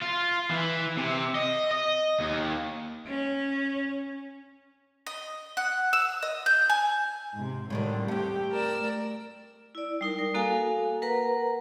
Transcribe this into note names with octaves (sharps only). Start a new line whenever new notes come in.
F4
E3
C3
D#5
D#5
D#2
C#4
D#5
F#5
E6
D#5
G6
G#5
G#2 C3
A2 D3 D#3 G3 C4
A3 C4 G4
A#4 D5 E6
E4 D5
G3 D#4 A#4
A#4
A#3 F#4 A4 F5 G#5
A#4 B4 F#5 A#5